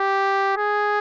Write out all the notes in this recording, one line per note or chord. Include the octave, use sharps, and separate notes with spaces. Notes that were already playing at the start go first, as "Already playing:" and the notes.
Already playing: G4
G#4